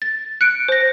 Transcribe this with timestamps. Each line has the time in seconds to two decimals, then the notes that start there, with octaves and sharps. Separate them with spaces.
0.02 A6
0.41 F#6 C#7 D7
0.69 C5 A#6